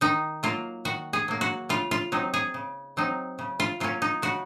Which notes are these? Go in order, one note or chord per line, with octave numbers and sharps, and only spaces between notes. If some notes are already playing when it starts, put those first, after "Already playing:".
D#3 D#4
F#3 A#3 F4
D#3 F#4
G#4
F#3 A#3
F#4
C#3 F4
F4
F#3 C4 D#4
G#4
C#3
F#3 C4 D#4
C#3
F4
F#3 A#3 C#4 F4
D#4
C#3 F#4